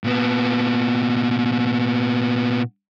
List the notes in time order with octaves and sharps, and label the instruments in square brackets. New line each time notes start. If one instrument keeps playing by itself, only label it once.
[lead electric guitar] A#2 B3